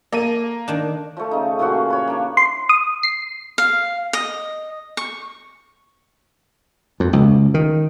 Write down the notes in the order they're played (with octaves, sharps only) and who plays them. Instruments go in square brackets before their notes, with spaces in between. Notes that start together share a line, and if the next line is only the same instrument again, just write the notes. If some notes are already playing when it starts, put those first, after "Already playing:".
[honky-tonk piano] A#3 D#7 [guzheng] A4
[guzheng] D#3 D4
[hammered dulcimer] F3 A3
C#3 D#4
A#2 E3 F3 F#4
C#5 B5
A#3 D4
[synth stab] C6
D#6
C7
[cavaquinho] F5
D#5
C#6
[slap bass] F2
C#2
D#3